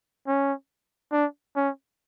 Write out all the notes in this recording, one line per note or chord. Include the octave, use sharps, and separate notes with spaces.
C#4
D4
C#4